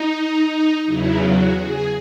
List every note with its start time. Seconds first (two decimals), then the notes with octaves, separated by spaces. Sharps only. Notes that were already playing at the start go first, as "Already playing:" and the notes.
Already playing: D#4
0.85 E2 C#3 F#3 E4
1.19 F#4
1.53 G#4